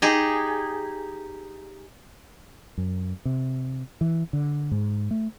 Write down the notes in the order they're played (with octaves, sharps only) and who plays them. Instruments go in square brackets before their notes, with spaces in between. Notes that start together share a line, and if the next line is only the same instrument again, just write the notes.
[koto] D#4 G4 G#4
[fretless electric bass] F#2
C3
E3
D3
G#2
A3